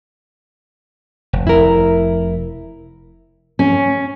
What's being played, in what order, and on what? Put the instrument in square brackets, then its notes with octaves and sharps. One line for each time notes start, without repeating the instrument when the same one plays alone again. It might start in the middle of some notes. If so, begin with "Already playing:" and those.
[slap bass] F1
[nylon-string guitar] E4 A#4
[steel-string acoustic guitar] C#4